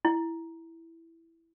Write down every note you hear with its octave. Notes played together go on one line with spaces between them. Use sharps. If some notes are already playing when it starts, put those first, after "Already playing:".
E4